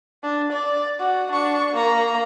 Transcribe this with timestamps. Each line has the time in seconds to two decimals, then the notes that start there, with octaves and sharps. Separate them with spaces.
0.24 D4
0.52 D5
1.00 F#4
1.32 D4 C#6
1.73 A#3 A#5